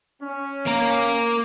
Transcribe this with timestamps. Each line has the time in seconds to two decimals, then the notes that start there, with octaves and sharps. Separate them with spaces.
0.22 C#4
0.67 A#3 A#4